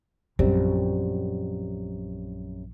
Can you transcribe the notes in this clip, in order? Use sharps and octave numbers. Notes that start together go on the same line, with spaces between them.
A#1 F#2 G3 C4